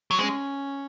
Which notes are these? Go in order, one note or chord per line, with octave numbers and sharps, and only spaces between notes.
F#3
G#3 C#4